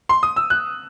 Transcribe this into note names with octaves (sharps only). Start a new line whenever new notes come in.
C6
D#6
E6
F#6